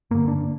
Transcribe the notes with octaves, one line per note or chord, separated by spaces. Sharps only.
G2 D3 A#3
D4